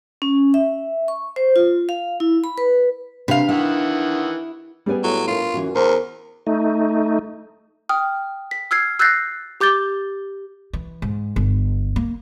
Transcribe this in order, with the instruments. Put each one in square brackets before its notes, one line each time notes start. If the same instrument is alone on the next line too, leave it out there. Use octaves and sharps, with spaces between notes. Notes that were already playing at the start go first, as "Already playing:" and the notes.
[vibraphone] C#4
E5
C#6
C5
F4
F5
E4
B5
B4
[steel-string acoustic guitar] C3 [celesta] D4 [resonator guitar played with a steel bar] B4 F5
[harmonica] D#3 E3 F#5 [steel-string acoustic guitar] E4
[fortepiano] G3 B3 [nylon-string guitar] G#4 D5 G#5
[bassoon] A2 [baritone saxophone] F#3
[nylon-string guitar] D4 A#4 [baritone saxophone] F4
[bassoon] F#2 [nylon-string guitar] E3 C#4
[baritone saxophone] E2 [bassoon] A#4 [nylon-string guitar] C5
[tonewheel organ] A3 D#4
[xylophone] G5 D#6 F6
B6
E6 F6 G#6 C7
E6 F#6 G6 A6 A#6 C7
G4 D6 G6 A6 G7
[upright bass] E3
G#2
G1
A#3